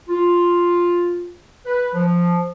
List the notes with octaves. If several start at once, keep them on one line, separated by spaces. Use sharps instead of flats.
F4
B4
F3